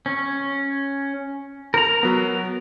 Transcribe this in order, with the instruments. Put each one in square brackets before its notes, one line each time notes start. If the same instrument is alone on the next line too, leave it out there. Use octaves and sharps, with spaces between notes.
[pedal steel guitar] C#4
A#4 A#5
[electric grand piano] F#3 B3